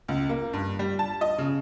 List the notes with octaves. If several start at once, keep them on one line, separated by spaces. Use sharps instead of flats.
C#2
A#3
G2
G3
A5
D#5
C#3